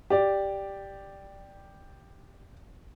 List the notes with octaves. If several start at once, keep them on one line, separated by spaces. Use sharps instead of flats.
G4 D5